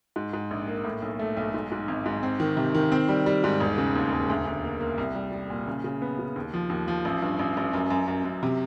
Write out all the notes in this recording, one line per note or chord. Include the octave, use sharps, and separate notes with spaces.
G#2
G#2
A#1
A#3
A2
B1
A3
B1
G#2
G#2
G#1
G#2
C4
D#3
C3
D#3
C4
G3
G3
G#2
E1
C#3
D#2
E1
D2
D2
A#3
A#3
C2
G3
G3
A#2
C#3
C#3
B3
C#3
D#2
F3
D#2
F3
A1
G2
A1
A1
F#2
F#2
F#2
F#2
C3